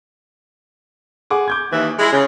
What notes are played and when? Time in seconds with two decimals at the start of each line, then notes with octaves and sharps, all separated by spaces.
1.30 G#4 F#5 D6
1.48 D6 G6 G#6
1.71 D#2 E3
1.99 G#3 E4
2.12 C#3